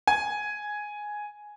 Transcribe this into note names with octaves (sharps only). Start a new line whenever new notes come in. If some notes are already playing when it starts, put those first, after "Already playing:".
G#5